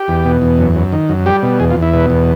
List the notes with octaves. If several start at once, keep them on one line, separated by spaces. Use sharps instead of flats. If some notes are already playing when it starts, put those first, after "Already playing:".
Already playing: G4
E2
B2
E2
F#2
F#2
D#3
F#2
G3 G4
B2
E2 G#4
F4
E2
E4
B2
E2